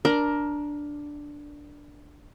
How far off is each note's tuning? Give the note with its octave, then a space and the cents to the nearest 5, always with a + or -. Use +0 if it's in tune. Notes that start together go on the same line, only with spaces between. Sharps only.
D4 +0 A#4 +15